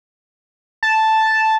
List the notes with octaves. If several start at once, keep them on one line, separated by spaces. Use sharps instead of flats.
A5